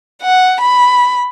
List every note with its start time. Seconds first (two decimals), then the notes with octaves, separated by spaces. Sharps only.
0.22 F#5
0.61 B5